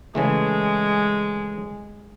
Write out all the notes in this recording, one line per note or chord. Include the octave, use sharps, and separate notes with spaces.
C#3 E3 G#3 A3